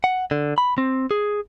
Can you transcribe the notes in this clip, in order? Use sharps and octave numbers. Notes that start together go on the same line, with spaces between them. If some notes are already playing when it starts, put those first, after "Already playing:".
F#5
D3
B5
C4
G#4